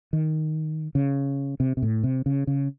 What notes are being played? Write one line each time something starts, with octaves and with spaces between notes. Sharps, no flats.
D#3
C#3
C3
C3
A2
C3
C#3
C#3